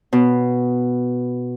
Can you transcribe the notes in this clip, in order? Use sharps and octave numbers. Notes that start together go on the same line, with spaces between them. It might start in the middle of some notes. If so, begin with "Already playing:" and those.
B2